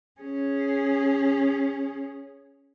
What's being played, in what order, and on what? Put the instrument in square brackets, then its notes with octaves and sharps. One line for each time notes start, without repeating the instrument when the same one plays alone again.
[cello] C#4 G#4